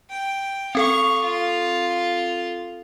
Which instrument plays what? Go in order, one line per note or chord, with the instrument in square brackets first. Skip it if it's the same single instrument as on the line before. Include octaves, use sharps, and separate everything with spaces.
[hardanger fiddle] G5
[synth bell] C4 A4 [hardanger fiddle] F5 C#6
[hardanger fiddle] F4